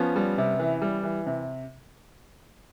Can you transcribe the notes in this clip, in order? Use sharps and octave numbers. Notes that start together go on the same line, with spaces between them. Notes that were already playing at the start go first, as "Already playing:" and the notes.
Already playing: F3 B3 C#4
G3
C3
E3
G3
E3
C3